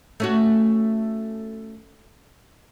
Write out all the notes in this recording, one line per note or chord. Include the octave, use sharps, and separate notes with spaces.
A3 C#4 F#4